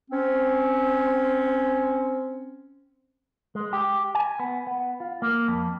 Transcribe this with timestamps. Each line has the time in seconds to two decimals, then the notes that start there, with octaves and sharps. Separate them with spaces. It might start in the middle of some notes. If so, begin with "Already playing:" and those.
0.11 C4 C#4
3.55 G#3
3.73 G4
4.15 G#5
4.39 B3
4.67 B3
5.00 F4
5.22 A#3
5.48 F2